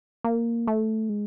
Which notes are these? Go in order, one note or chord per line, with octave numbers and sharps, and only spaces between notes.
A#3
A3
G#3